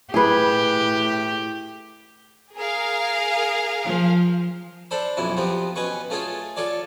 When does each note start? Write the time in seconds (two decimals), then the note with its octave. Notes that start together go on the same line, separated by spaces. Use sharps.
0.14 A2 G4 G#4 B4
2.54 G#4 A#4 F5
3.85 F3
4.91 D4 A4 C5 B5
5.17 B1 F2 C#4 E4
5.37 C3 F3 B3 C4
5.76 B2 C#4 B4 C#6
6.10 A3 C#4 F4 G#4 C#5
6.57 F4 A4 C#5 D5